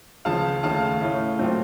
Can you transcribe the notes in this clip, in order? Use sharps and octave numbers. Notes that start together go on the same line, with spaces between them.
C#2 C#3 F3 F5 A5
D#2 C#3 A3 F5 A5
A2 A3 C#4
A#2 F#3 A3 C4